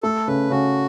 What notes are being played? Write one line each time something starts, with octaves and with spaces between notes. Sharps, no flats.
A3 A4
C#3 B4
C#3 F#4